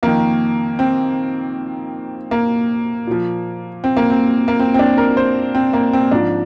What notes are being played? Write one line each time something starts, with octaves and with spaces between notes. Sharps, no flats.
F2 D#3 A#3
C4
A#3
A#2 F3
C4
A#3
C4
A#3
C4
C4
D4
A#4
C5
C4
A#3
C4
G#2 F3 D4